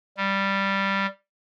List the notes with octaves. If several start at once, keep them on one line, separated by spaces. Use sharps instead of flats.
G3